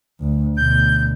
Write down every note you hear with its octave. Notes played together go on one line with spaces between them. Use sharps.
D2
D2 B2 G6